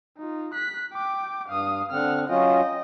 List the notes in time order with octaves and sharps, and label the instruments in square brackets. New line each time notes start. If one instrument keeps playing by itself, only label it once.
[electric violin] D#4 F4
F#6 B6
G5 D6
[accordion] G2 [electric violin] F5 D#6
[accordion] D3 C4 [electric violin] F#5 F6
[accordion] F#3 C#4 F4 [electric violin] D#5 G5